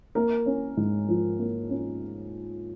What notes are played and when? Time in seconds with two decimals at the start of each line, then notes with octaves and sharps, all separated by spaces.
0.15 A#3 A#4
0.46 C#4
0.77 G#2
1.09 F3
1.39 A#3
1.70 C#4